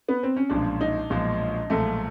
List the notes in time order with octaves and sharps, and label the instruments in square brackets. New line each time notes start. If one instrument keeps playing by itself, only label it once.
[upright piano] B3
C4
C#4
[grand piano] B1 A#2 F3 G#3 [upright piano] D4
[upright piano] D#4
[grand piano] B1 A#2 F3 G#3
[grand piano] B1 A#2 F3 G#3 [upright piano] A3